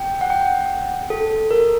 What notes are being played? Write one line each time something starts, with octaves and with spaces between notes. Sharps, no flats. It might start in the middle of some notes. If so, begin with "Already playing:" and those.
Already playing: G5
F#5
G5
A4
A#4